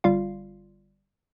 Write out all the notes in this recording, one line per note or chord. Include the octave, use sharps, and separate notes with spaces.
G1 G3 F4 F5